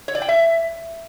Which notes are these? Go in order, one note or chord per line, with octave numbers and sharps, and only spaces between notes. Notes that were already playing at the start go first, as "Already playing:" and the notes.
C#5
D5
G5
E5